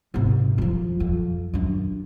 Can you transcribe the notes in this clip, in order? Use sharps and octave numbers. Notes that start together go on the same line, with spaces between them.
G#1 C3
F2 F3
F2
F#2 D4